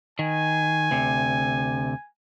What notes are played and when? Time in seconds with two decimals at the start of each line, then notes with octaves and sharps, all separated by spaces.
0.19 D#3 G#5
0.91 D2 C3